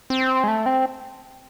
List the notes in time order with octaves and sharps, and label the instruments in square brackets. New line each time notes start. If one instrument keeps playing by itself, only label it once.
[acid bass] C4
G#3
A3
C4